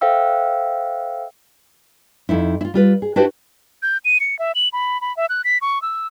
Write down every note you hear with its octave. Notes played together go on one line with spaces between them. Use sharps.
A4 C5 E5 F5 G5 E6
F2 D#4 E4
E4 F4
G3 F4 B4
G#4
D4 E4 F#4 G4 B4 C5
G6
D#7
C#7
E5
F#7
B5
B5
E5
F#6
B6
C#6
E6